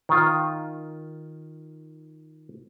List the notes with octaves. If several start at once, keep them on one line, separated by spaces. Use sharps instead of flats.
D#3 F4